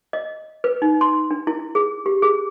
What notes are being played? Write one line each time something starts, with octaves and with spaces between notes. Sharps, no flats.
D#5
B4
D#4
C6
D4
E4
G#4
G4
G#4